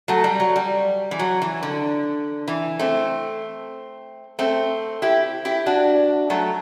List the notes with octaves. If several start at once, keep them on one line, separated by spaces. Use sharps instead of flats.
F#3 A3
G3
F#3
G3
E3
F#3
E3
D3
E3
A3 C4
A3 C4
E4 G4
E4 G4
D4 F#4
F#3 A3